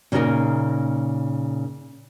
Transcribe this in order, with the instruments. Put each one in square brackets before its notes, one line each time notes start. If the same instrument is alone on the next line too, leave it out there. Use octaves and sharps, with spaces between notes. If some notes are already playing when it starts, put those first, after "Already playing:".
[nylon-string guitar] A#2 C#3 D#4 A4 A#4 D#5